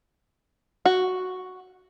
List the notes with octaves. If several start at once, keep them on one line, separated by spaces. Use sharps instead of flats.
F#4